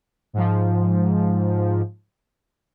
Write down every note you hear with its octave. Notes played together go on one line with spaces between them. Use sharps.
G#2 F3